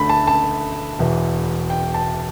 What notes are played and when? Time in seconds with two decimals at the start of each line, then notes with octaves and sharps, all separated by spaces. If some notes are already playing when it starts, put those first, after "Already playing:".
Already playing: D2 D3 A3 B5
0.09 A5
0.27 A5
0.99 E1 E2 E3
1.70 G5
1.94 A5